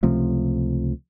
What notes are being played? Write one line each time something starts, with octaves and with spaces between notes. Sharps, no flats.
C#2 C3 F3 A3